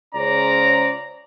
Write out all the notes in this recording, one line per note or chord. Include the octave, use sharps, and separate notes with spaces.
C#2 C#3 C#4 C5 D5 A#5